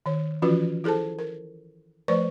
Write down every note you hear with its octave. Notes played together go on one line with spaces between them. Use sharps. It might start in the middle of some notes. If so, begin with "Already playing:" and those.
D#3 C#5
E3 F3 C#4 F4 F#4 B4
E4 G#4 A4 C5 A5
A#4
F3 A3 B4 C5 D5 C#6